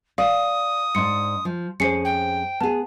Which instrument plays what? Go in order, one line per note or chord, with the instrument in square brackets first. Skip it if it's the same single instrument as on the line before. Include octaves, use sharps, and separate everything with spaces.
[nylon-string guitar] D5 [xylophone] F5 [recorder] D#6
[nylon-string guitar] G#2 D4 [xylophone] C6 C#7
[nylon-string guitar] F3
[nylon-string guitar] F2 C#4 G#4 [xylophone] C5 C7 C#7
[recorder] G5
[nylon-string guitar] B3 G#4 [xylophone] A5